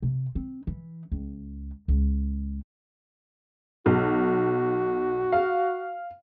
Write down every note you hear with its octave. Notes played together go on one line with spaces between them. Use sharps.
C3
C4
E3
C#2
C#2
B1 F#4
F5